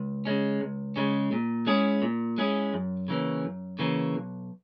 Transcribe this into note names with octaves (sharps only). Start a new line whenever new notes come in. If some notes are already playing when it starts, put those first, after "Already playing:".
Already playing: C#2
C#3 G#3 C#4
C#2
C#3 G#3 C#4
A#2
G#3 C#4 E4 G#4
A#2
G#3 C#4 E4 G#4
F#2
C#3 E3 A#3 C#4
F#2
C#3 E3 A#3 C#4
B1